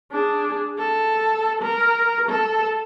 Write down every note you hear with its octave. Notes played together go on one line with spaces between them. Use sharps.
D4 G#4
A4
A#4
A4